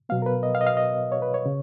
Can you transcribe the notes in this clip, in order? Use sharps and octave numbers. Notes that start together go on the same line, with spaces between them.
B2 F#3 B3 F5
A#4
B4
D#5
F5
D#5
F5
D#5
C#5
B4
C#5
C#3